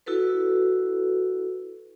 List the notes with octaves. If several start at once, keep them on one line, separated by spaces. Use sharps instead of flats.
E4 F#4 A4 B4